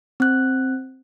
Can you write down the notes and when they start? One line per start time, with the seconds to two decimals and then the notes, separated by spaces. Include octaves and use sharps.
0.20 C4 F#6